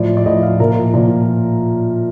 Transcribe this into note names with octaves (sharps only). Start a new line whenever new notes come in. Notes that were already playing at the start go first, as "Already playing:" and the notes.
Already playing: A2 F3 D5
D5
A2 F3 D#5
F5
A#2 F3 A#4
A#2 F3